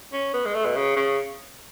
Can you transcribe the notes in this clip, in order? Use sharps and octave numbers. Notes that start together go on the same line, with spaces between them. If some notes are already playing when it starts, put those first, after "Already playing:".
C#4
B3
G#3
A3
B2
C#3
C#3